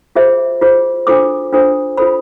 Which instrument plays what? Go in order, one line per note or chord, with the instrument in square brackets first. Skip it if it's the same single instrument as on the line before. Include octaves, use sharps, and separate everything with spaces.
[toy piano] F4 G#4 C5 E5
F4 G#4 C5
D4 F4 A4 C5 D6
D4 F4 A4 C5
F4 A4 C5 B5